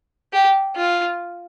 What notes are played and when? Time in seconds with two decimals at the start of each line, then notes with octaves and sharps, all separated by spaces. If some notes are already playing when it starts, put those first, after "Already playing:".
0.33 G4
0.76 F4